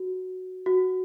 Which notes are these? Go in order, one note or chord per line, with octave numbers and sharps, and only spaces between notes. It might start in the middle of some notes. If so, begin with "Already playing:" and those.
Already playing: F#4
F#4